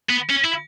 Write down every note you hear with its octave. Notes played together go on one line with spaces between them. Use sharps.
B3
C#4
E4